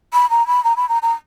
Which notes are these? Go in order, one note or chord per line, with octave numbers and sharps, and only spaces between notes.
B5
A#5
B5
A#5
B5
A#5
A#5